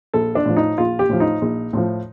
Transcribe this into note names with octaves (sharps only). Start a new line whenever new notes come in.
A#1 A4
D4
A2 F3
D#4
A#1 F4
G4
A2 F3
D#4
A#1
A2 F3